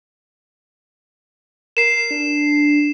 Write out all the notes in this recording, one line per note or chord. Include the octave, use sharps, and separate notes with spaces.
A#4 C7 E7
D4